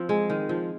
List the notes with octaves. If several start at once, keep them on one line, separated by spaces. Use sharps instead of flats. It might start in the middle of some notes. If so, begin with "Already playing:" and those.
Already playing: F3 C4
G#3
D#3
F3